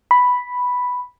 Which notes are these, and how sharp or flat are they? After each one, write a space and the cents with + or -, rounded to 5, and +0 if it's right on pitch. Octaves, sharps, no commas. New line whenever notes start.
B5 +0